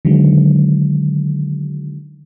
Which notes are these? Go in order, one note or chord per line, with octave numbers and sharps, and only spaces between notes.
D3 D#3 F#3 G#3